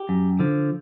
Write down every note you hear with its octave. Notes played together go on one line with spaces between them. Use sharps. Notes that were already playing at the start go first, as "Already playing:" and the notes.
Already playing: G4
F#2
D3 F3